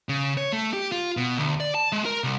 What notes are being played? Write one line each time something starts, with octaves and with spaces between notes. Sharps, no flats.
C#3
C#5
A3
G4
F4
B2
D2
D5
A5
G#3
A#4
C2